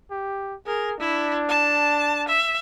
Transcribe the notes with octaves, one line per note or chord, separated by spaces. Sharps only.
G4
G#4 A#4
D4 E4
A5
E5